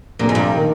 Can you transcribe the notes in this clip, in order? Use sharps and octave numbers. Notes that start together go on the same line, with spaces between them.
F1 A#2
G#2
G2
D#3